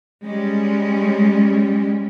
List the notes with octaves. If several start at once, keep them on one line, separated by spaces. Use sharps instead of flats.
G3 G#3 C#4